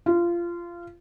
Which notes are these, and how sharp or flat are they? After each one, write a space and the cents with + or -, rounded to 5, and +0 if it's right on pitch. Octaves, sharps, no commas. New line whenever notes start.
F4 -20